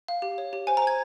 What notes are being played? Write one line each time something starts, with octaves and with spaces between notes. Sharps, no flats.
F5
G4
C#5
G4
C5 G#5
C5 A#5
G#6